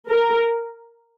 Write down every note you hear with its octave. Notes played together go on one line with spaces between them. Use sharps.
A#4